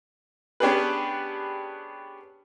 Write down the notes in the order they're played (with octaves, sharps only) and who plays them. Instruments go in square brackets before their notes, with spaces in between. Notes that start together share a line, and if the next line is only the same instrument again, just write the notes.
[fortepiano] B3 C#4 D4 G4 G#4 B4